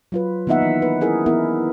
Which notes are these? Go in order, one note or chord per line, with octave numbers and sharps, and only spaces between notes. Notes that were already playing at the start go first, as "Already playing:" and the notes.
F#3 F4 B4
D#3 A#3 B3 D#4 E5 F#5
E3
B4
C#4 E4 G#4 A#4
E3 B3 E4 A#4